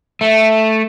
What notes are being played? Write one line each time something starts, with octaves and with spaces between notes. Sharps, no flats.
A3